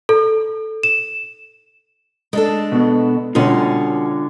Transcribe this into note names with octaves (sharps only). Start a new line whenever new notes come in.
A4
E7
G#3 D4 A4
B2 B3
B2 D3 C#4 F4